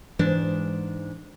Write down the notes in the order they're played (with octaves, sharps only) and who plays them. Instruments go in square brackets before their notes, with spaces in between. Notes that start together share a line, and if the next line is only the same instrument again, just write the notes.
[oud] G#2 [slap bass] E3 [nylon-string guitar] D4